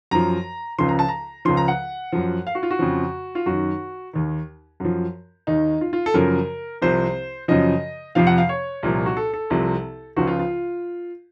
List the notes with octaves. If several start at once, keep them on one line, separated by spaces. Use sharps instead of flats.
F#2 F3 A#5
C#2 C#3 F3 C6
A#5
A5
A#5
C#2 C#3 F3 C6
A#5
F#5
F#2 F3
F5
F#4
F4
F#4
F2 C#3 F3
F4
F#2 D#3 F#4
D#2 D#3
F#2 F3
D#2 D#3 D#4
F4
F4
A4
F#2 C#3 F3 A#4
C2 C3 F3 C5
F#2 C#3 F3 D#5
F2 C3 F3 F5
F#5
F5
C#5
C2 A#2 F3
F#4
A4
A4
C2 C3 F3
C#2 C#3 F3 F#4
F4
F4